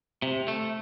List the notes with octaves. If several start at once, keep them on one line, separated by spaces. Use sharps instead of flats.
C3
A3